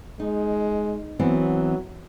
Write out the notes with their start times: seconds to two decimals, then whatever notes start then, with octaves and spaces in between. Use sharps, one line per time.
0.20 G#3 D#4
1.19 E3 F#3 B3 C4